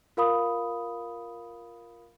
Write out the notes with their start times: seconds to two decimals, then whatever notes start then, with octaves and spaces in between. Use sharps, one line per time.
0.17 F4 A#4 F5 B5 D#6